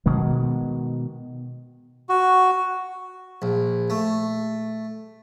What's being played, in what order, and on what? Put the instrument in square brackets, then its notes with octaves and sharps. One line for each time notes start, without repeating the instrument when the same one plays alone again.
[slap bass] B2 D#3 G#3
[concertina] F#4
[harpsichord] A#1
A3